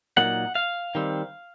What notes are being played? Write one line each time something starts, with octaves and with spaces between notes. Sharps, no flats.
A#2 F#3 A#3 D#4 F#5
F5
D#3 G3 C4